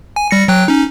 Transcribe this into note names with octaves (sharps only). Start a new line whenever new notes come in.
G#5
G3 A#6 C#7
F#3 G5 F#6
C#4 D#4